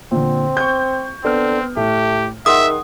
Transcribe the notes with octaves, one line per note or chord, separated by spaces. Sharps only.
A#2 D3 C4
C#6 G6
D3 B3 C4 F6
A2 A3 G4
D#3 G#4 E5 F#5 C6 D#6